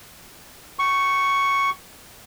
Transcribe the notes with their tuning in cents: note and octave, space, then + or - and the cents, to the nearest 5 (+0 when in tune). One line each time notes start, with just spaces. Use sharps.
G5 -30 C#6 +0